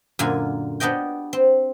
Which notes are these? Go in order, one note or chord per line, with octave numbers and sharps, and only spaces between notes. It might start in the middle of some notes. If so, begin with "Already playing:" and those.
F#2 A#2 D3 F4 G#5
B3 D4 G4 D#5 G5
C4